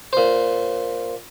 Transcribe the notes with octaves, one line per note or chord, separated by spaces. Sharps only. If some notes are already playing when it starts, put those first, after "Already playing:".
A#2 C5